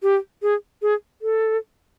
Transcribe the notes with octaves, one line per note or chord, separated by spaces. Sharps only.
G4
G#4
G#4
A4